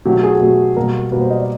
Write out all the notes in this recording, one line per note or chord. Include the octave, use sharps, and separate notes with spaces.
B2 F#3 A3 G4
F#4
G#4
A4
B2 F#3 A3
B2 G3 A#3 A#4
B2 G3 A#3 B4
C5
D#5
D5